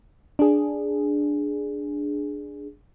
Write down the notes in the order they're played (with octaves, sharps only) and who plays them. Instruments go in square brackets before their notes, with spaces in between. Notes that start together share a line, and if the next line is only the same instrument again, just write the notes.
[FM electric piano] D4 G#4